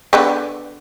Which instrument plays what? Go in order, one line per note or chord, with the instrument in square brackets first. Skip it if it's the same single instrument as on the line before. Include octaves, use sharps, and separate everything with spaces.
[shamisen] D3 B3 G4